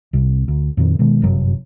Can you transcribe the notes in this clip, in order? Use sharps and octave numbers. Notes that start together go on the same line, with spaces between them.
C2 C3
D2
F2 A#2 D#3
B2 D#3 G#3
G1 F#2 C3 F#3